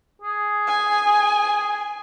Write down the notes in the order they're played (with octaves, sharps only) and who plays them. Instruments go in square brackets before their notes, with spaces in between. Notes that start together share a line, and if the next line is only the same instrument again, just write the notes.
[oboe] G#4
[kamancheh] G#5
[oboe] G#4